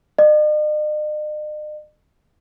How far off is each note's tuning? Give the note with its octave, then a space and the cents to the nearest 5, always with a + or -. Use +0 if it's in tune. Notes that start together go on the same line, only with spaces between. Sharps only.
D#5 -45